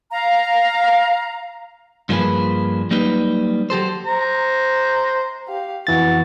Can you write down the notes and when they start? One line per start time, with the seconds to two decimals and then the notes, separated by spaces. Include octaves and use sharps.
0.11 F5 A#5
2.09 G2 F3 A#3 C#4 G#4 B4
2.91 F#3 G3 A#3 D#4 B4
3.70 F#3 G4 A4 C5
4.06 C5 A#5
5.48 G4 F5
5.87 F2 E3 B3 F#4 A6